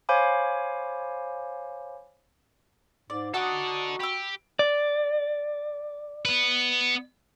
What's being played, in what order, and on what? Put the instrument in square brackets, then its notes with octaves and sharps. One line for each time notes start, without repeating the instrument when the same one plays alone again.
[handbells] C5 C#5 F5 G#5 B5 D6
[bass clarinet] G#2 [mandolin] D5
[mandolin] D#4 D#5 F#5 [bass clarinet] F#4 [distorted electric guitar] A4 D5
[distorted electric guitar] G4 [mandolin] B5 E6
[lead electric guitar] D5
[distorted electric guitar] B3 B4